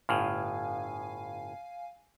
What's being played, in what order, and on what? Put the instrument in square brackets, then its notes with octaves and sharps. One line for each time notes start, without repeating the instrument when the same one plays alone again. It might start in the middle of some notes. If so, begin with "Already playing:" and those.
[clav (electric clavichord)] G1 A2 [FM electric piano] F5 G#5